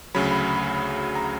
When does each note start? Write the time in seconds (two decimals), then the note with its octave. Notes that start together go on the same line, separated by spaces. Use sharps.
0.15 D2 C#3 F#3 B5
0.31 B5
1.15 A#5